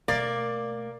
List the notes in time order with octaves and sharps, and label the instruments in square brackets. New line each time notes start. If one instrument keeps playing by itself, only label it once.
[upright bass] B2 A3 [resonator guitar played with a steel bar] A#3 [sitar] D5